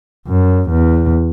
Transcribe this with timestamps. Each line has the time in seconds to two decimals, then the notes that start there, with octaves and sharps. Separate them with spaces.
0.27 F#2
0.71 E2